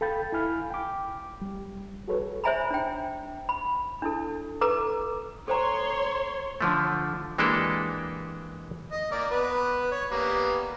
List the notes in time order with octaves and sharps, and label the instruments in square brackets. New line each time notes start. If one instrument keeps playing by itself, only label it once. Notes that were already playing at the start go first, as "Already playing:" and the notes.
[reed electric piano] A4 F5 G5 B5 G6 A6
E4 F5 G#5 B5 F6
G5 D6
G3
F#4 G#4 A4 B4 C#5
[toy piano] C5 C#5 E5 G#5 A#5 B5
D4 G5
B5
D4 E4 A4
A4 B4 A#5 D6 D#6
[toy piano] A4 C5 A#5 [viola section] C#5 C6
[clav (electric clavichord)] D3 F3 A3
E3 G#3 A#3 D4 G4 A4
[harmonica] D#5
A#3 D5
B3 B4
C#5
G3 A#3 B3